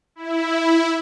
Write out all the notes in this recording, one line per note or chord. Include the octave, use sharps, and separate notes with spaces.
E4